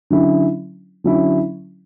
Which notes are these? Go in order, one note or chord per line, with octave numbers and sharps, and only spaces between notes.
D3 F#3 C#4 E4
D3 F#3 C#4 E4